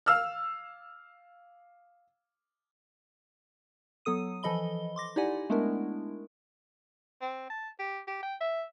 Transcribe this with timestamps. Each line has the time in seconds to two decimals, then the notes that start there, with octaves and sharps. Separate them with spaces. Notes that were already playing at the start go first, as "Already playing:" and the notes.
0.06 F5 E6 F6
4.05 F#3 B3 A4 D#6 D#7
4.43 E3 F3 A4 D#5 B5 G7
4.96 C6 D6 A#6
5.16 D#4 E4 G4 D5 F#5 G#5
5.50 G#3 A3 B3 D4 E4 A#4
7.21 C4
7.50 A5
7.79 G4
8.07 G4
8.23 G5
8.41 E5